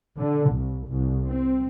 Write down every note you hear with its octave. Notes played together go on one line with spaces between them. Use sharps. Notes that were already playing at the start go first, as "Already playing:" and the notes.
D3
C2
C2
C4